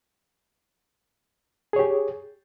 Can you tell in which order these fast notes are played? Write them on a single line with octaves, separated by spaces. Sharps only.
G#4 C#5 G4